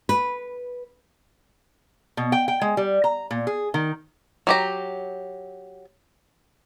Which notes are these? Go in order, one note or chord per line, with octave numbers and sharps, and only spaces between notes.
B4
B2
G5
G5
G#3
G3
A#5
A#2
G#4
D#3
F#3 G4 A#5